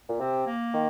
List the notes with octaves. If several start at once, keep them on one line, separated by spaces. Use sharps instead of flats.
A#2
C3 C4
A#3
D#3